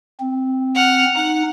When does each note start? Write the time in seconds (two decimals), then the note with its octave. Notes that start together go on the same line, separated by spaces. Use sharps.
0.20 C4
0.75 F#5 F6
1.15 D#4 F#5